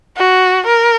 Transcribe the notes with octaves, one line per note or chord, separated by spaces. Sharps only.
F#4
A#4